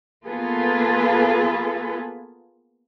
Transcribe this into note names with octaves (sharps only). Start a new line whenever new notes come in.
A#3 B3 F4 G#4 A4 B4